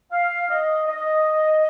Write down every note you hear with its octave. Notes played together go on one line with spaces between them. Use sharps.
F5
D#5
D#5